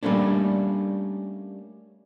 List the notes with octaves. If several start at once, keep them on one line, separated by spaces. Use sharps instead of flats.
G3 A3 A#3 C#4 D4